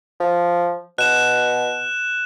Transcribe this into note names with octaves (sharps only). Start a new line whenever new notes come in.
F3
B2 F#6 E7